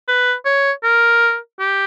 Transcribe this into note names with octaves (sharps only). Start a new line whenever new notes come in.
B4
C#5
A#4
G4